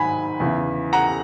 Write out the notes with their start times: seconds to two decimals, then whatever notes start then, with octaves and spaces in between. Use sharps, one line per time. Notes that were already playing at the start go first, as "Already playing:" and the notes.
Already playing: G#2 D#3 F#3 G#5 B5
0.40 E2 C#3 E3
0.93 F#5 A#5